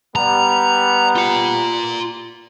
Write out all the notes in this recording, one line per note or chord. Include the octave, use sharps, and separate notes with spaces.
G3 B3 A#5
F4 A#5